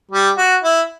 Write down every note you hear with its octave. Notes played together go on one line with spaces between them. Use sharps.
G3
F#4
E4